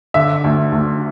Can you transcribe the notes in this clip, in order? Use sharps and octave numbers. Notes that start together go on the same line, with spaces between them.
D3 E5
D2
D2